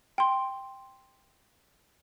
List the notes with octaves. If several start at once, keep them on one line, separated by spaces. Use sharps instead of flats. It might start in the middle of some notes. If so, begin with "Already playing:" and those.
G5 C6